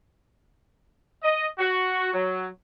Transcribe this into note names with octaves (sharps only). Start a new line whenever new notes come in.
D#5
F#4
F#3